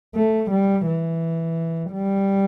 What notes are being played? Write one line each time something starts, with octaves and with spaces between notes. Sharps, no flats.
A3
G3
E3
G3